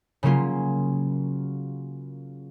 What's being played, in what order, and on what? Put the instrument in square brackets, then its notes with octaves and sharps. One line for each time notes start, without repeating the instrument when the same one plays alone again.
[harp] C#3 F#3 A#3 C#4 F4